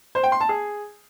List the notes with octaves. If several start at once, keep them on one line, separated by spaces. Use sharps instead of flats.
C5
G5
C6
A5
G#4